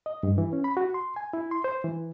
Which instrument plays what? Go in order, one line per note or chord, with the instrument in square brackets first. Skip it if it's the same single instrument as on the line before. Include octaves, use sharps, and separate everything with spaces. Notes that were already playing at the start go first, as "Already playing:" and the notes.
[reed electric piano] D#5
G2
E3
C#4
B5
F#4
C6
G#5
E4
C6
C5
E3